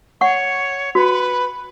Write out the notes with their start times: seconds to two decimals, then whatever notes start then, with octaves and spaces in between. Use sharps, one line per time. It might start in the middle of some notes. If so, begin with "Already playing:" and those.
0.21 C#5 F#5 C#6
0.95 F#4 B4